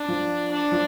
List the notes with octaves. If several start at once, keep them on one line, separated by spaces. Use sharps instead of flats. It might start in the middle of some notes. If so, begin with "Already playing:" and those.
Already playing: D4
F3
D4
F3